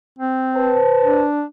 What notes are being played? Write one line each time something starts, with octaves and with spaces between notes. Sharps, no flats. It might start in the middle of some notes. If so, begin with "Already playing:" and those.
C4
B4 C5 A5
D4